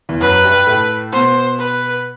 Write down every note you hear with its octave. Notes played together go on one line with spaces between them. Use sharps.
E2 E3
F#2 F#3 B4
G2 G3
A2 A3
B2 B3 C5
B4